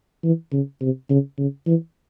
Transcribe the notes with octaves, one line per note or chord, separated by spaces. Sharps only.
E3
C#3
C3
C#3
C#3
E3